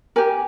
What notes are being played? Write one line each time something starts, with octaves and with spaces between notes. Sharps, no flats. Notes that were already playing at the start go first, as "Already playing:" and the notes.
G4 A#4 G#5